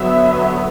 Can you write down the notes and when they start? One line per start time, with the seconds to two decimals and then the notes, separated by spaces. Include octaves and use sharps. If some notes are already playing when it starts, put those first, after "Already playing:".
Already playing: D3 F#3 B3 E5